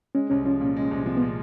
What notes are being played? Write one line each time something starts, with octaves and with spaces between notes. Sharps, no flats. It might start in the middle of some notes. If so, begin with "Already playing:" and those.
G#3 C#4
C2 C#4
F3 C#4
A#2
G#3
C2
F3 C4
B3
A#2